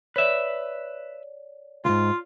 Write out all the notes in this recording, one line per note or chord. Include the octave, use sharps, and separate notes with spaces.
B4 C#5 D5 E5
C#2 G#2 F4